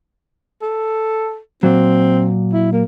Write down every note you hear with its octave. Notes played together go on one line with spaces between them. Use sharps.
A4
A#2 F#3 C4
E4
A#3